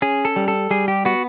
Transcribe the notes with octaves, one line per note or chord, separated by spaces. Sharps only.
C#4 G#4
A4
G3
A4
G3 G#4
G4
B3 F#4